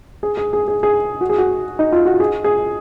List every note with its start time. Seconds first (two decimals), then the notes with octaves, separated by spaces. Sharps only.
0.23 G#4
0.37 G#4
0.53 G#4
0.68 G#4
0.83 G#4
1.21 F#4
1.29 G#4
1.38 F#4
1.79 D#4
1.93 F4
2.06 F#4
2.20 G#4
2.44 G#4